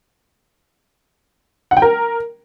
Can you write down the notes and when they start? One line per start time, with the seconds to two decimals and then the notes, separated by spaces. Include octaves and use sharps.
1.71 F#5
1.77 G5
1.82 A#4